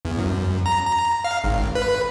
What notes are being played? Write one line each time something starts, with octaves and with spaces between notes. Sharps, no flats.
E2
F#2
A#5
A#5
F5
G#1
B4